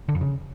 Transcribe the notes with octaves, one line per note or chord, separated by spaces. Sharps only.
D3
F2
C#3